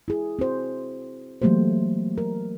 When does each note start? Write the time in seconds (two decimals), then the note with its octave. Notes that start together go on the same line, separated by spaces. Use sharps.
0.08 E4 G#4
0.39 C4 F#4 C5
1.42 E3 F#3 A3 A#3 G4 C5
2.18 A#4